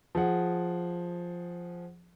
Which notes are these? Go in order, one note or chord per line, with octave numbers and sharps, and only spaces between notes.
F3 G#4 F#5